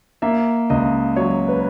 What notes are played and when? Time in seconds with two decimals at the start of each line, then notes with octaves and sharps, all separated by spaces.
0.22 A#3 E5
0.70 C#2 D#5
1.16 F#3 C#5
1.49 B4